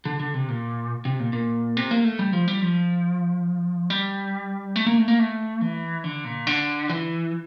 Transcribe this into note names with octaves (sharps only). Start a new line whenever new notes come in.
D3
D3
C3
A#2
C3
A#2
A#2
C3
A#3
A3
G3
F3
G3
F3
G3
A3
A#3
A3
A#3
A3
E3
D3
A#2
D3
E3